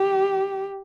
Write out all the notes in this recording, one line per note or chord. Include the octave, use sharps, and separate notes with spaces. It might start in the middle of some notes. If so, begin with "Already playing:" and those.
Already playing: G4